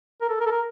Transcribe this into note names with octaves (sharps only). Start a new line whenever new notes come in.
A#4
A4
A#4
A4
A#4